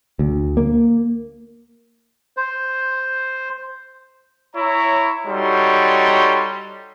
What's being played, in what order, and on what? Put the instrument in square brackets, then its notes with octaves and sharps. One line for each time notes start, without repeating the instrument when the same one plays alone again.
[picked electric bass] D2
A#3
[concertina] C5
[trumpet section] E4 C#5 A#5
G3 D#4 F#4 A4 C#5 C6